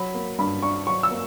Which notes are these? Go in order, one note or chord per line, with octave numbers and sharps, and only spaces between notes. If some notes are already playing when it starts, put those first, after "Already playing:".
Already playing: F#3 B5
A#3
G2 B5
D4 C#6
F#3 C#6
E6
A#3